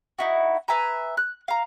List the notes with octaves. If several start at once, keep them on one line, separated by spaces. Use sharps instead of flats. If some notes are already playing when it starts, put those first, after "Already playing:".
D#4 E4 F#4
B4 E5 G#5 A#5
F#6
F5 A#5